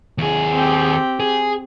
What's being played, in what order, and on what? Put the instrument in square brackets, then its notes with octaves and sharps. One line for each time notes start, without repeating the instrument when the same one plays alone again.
[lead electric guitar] D#2 G#4
[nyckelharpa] C4 G4
[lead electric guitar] G#4